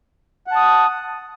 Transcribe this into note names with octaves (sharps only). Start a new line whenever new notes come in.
F#5 A5 D#6